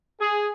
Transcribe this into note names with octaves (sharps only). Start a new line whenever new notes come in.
G#4